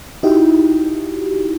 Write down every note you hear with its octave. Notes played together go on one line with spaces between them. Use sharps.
D#4 E4 F#4 G4